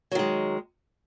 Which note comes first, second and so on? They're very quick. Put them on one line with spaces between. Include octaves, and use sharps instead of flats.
F#3 D#3 G#3